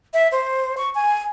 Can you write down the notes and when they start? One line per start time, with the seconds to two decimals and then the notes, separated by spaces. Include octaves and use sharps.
0.14 E5
0.32 C5
0.77 C#6
0.95 G#5